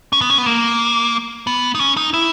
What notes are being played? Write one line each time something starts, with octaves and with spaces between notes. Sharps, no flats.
C#4
B3
C#4
B3
A#3
B3
D#4
C#4
D#4
E4